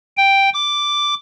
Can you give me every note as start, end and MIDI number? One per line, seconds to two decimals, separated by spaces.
0.17 0.49 79
0.54 1.14 86